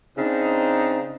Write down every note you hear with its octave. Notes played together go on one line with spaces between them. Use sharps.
C#3 C4 D4 D#4